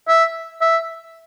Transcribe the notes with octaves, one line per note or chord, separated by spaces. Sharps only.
E5
E5